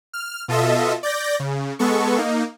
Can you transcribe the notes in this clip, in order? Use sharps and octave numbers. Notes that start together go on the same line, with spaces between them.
F6
B2 F4 A4 D#5 E5
D5 G6 A#6
C#3
G#3 B3 A4 C#6
A#3 D#4